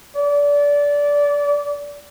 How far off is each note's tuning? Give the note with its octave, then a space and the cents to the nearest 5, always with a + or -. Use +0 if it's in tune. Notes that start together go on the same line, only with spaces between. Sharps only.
D5 -25